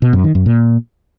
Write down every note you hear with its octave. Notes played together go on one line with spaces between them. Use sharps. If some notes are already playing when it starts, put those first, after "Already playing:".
B2
F#2
D#3
F#2
A#2